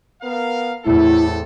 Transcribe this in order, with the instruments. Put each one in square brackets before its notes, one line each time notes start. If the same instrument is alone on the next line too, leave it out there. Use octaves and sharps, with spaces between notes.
[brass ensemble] B3 A#4 F5
[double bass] E2 A2 [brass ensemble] A3 C4 A4 [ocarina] E4